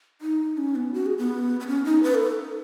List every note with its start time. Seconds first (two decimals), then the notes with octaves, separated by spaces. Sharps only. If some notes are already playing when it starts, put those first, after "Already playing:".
0.21 D#4
0.57 C#4
0.75 B3
0.94 F#4
1.06 G#4
1.18 B3
1.60 B3
1.67 C#4
1.84 D#4
2.03 B4
2.15 A4